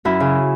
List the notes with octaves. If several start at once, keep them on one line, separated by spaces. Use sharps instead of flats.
F#2 E4
C#3